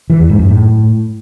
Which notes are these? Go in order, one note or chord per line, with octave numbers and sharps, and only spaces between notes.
E3
E2
G#2
F#2
A2